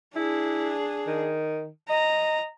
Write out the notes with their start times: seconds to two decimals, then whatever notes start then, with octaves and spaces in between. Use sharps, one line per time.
0.16 D4 E4 G#4
1.07 D#3
1.90 D#5 A#5